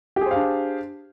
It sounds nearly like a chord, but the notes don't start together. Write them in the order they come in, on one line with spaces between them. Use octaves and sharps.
G4 G#4 C5 F5 D4